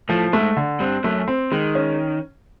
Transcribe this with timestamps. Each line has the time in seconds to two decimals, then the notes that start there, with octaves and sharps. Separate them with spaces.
0.09 A2 F3 A3
0.33 G#2 G#3 A3
0.57 D3
0.80 G2 G3 C4
1.04 F#2 F#3 A3
1.28 C4
1.52 D#3 G#3
1.75 C#4